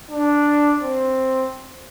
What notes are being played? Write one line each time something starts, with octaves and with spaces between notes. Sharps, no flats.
D4
C4